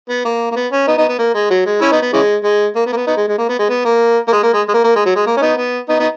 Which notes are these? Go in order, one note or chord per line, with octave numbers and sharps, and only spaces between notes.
B3
A#3
A#3
B3
C#4
B3 D#4
B3 D#4
B3
A#3
G#3
F#3
G#3
C#4 E4
B3 D#4
B3
C#3 E3 G#3
G#3
A#3
B3
A#3
B3
B3 D#4
G#3
G#3
A#3
B3
G#3
B3
A#3
A#3
G#3
A#3
G#3
G#3
A#3
A#3
G#3
F#3
G#3
A#3
C#4
B3 D#4
B3
B3 D#4
B3 D#4